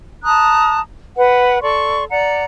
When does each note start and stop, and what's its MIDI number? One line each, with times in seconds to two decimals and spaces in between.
0.24 0.80 81
0.24 0.80 82
0.24 0.80 87
0.24 0.80 90
1.16 1.58 71
1.16 1.58 78
1.62 2.04 69
1.62 2.04 74
1.62 2.04 84
1.62 2.04 85
2.10 2.44 74
2.10 2.44 78
2.10 2.44 82